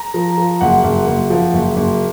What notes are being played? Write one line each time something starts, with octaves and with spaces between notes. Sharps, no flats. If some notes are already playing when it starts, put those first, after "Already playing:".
Already playing: A#5
F3
F3
F#1 F#5
F#1
F#1
F3
F#1
F#1